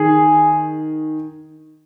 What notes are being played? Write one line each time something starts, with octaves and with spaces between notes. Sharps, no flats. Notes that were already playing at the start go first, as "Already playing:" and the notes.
Already playing: D#3 G#4